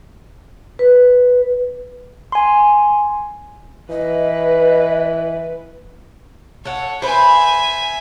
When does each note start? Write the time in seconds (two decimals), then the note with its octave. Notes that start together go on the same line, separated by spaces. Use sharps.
0.79 B4
2.32 G#5 C6
3.91 E3 B4 D#5
6.65 A4 C#5 F#5
7.02 B4 C5 E5 G#5